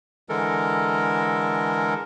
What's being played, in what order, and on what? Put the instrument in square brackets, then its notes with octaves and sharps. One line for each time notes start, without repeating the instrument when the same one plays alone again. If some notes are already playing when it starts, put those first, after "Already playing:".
[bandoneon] D3 E3 G#3 A4 A#4